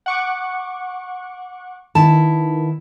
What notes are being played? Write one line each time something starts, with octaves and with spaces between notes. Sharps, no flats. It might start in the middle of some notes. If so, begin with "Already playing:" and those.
F#5 C#6 D6
D#3 B3 E4 A5